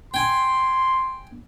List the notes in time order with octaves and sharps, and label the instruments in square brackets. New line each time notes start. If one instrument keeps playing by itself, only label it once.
[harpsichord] G5 G#5 [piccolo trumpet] C6